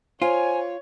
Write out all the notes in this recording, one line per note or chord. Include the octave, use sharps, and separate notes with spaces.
F4 C5 C#5 G#5